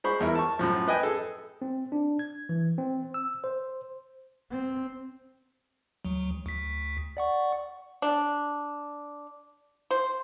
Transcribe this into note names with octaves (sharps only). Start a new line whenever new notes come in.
G#3 C5 B5 C#6
E2 E4 A#4
A5 C#6
F#2 A2 F3
B4 D#5 G5 G#5
G#4 A4
C4
D4
G#6
E3
C4
E6
C5
C4
D2 F#3
D2 B6
D5 F#5 C#6
D4
C5